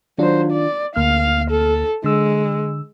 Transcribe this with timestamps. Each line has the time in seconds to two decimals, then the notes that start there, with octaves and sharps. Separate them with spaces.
0.18 D#3 F#3 D4 F4 C5
0.52 D5
0.96 D2 A#3 F5 F6
1.51 A4
2.04 D3 G#3 E6